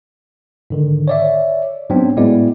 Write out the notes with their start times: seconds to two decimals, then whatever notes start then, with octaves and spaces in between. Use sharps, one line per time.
0.70 G#2 D3 D#3
1.08 C#5 D5 E5
1.90 G#2 F#3 B3 C4 D4
2.17 A2 G#3 B3 E4 F#4 D5